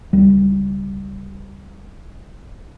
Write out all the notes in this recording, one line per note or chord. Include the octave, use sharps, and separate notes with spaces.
C#2 G3